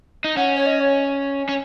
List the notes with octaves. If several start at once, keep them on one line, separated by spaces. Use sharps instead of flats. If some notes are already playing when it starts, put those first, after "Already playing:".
D#4
C#4 F#5
C#5
D#5
C#5
C#4